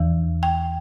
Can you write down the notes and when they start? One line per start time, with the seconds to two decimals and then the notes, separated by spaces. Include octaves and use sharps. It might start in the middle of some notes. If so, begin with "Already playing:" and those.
Already playing: E2 E3
0.43 G5